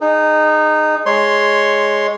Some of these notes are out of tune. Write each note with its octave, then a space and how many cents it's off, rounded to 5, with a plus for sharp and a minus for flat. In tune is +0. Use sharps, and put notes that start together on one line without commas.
D#4 -20 G#4 +0
G#3 +0 C#5 +0 C6 +0